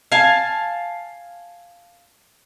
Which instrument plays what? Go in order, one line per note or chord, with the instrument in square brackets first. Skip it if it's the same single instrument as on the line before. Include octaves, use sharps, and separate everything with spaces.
[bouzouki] F5 G#5 A5